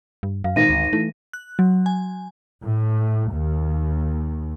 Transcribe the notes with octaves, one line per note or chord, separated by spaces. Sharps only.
G2
F#2 F5
G#1 A#2 A#6 D#7
D2
E3 A3
F#6
F#3
G#5
A2
D#2